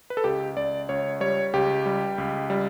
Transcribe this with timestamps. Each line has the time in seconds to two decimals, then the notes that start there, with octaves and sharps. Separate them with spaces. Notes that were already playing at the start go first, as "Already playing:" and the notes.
0.10 B4
0.17 A4
0.24 C#2 G4
0.56 C#2 D5
0.89 C#2 C#5
1.20 G3 C#5
1.53 C#2 G4
1.86 G3
2.18 C#2
2.50 G3